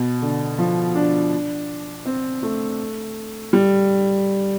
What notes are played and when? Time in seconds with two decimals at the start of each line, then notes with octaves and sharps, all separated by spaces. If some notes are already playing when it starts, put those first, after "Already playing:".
Already playing: B2
0.22 D3
0.58 F3
0.95 D4
2.05 C4
2.43 A3
3.53 G3